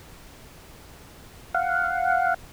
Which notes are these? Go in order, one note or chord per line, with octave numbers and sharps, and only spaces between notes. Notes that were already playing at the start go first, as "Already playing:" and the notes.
F5 F#5